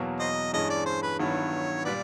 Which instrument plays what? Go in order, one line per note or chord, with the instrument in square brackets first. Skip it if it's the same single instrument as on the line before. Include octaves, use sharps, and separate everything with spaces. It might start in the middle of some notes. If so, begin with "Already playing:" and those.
Already playing: [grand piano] E2 B2 F#3 A#3
[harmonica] C5 D#5
[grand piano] G2 E3 G#3 C#4 [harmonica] D#5
[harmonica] D5
C5
B4
[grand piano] G2 D#3 F#3 B3 E4 [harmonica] C#5
[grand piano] A#2 G3 [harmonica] B4 D5